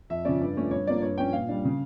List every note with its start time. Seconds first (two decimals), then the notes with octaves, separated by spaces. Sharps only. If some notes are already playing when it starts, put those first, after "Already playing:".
0.10 F2 E5
0.25 C#3 F3 C#4 D5
0.41 G2
0.56 F3 A3 C#4
0.71 G2 C#5
0.87 F3 A#3 D5
1.02 G2 C#5
1.17 F3 C#4 G5
1.33 A#2 F5
1.48 G3 D4
1.65 C#3